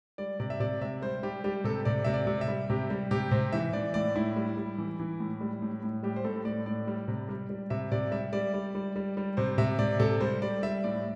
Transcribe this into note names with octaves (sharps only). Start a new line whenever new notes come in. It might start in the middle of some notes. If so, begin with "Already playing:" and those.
G3 D5
C3 D5
E5
C3 D5
C3 E5
G3 C5
G3 G4
G3 G4
C3 A4
C3 D5
C3 E5
D5
C3
E5
G3
C3 G4
G3
C3 G4
C3 C5
E3 E5
E3 D5
A2 D5
A2 E4
G3
G3
E3
E3
A2
G3
A2
A2
G3 G4
C5
A2 A4
A2 D5
A2 D5
G3
C3
G3
G3
C3 E5
C3 D5
G3 E5
G3 D5
G3
G3
G3
G3
C3 C5
C3 E5
C3 D5
C3 A4
G3 C5
G3 D5
G3 E5
A2 D5